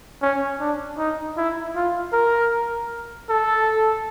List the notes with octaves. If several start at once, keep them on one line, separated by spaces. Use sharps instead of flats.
C#4
D4
D#4
E4
F4
A#4
A4